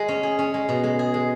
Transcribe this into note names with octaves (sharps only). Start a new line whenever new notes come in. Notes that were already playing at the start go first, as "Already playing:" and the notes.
Already playing: G#3
C#4
G#4
C#4
G#3
B2
G#3
G#4
G#3